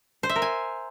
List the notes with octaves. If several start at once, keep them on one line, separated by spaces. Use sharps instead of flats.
C5
E5
A#4
G#5